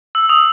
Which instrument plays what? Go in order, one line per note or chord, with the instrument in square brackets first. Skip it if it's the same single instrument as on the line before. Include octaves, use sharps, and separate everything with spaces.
[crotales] E6
D#6